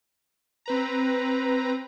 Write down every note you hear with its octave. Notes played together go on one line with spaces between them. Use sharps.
C4 B4 A#5